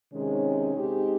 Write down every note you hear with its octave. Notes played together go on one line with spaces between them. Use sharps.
C3 D#3 G#3 C#4
G#3 C4 D#4 G4